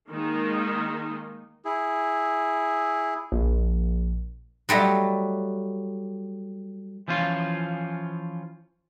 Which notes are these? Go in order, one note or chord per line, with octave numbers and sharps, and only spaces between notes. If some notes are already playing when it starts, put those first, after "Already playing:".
D#3 G#3 A#3 D#4
E4 G#4
A#1
F#3 G3 A3 D#5
E3 F3 C#4 F4